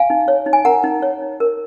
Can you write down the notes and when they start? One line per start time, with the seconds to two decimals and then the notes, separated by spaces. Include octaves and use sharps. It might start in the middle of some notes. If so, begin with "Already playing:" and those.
Already playing: F5 G#5
0.10 D#4
0.28 C#5
0.46 D#4
0.53 G#5
0.65 A#4 F#5 A#5
0.84 D#4
1.02 C#5
1.22 D#4
1.40 A#4